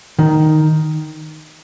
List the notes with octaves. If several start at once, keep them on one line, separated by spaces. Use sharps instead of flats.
D#3